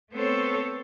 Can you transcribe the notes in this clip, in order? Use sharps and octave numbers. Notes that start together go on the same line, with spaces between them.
A3 B3 C4 A4 C5 C#5